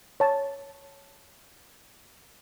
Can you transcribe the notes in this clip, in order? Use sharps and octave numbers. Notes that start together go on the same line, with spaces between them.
C#5 A5